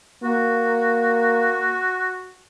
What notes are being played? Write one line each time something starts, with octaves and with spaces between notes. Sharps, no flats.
A#3 F#4